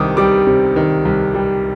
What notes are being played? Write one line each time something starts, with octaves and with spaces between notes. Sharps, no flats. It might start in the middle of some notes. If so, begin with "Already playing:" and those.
Already playing: C2 C3 D#3 D6 D#6
G3 D6
C3
D#3
C2
G3